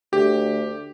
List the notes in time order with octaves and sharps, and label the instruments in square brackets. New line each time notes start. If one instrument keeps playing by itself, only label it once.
[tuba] D2 [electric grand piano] G4